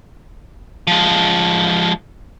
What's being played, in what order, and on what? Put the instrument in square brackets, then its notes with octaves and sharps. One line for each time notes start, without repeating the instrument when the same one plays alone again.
[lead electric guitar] F3 G#3